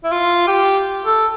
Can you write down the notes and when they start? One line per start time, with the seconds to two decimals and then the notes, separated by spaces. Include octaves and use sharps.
0.04 E4
0.11 F4
0.47 G4
1.06 A4